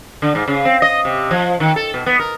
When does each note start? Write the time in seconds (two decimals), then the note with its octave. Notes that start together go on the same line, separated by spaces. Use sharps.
0.22 D3
0.35 G#2
0.48 C#3
0.65 C4
0.82 D#5
1.05 C3
1.31 F3
1.60 D#3
1.76 A4
1.94 B2
2.06 B3
2.19 A#4